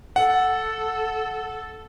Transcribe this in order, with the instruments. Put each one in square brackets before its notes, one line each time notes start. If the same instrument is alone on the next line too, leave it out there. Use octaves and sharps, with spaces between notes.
[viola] A4 [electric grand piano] F#5